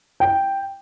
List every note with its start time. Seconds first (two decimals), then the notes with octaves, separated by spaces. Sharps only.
0.20 G5